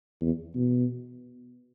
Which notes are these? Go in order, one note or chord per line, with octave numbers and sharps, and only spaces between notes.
E2
B2